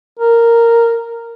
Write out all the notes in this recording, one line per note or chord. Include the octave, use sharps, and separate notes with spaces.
A#4